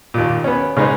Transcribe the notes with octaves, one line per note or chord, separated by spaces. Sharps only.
D#2 A#2
B3 C#4
C#3 G#3 D#4 B4 C5